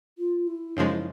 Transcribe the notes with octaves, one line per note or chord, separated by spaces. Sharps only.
F4
E4
F#2 C#3 F3 G#3 D#4
E4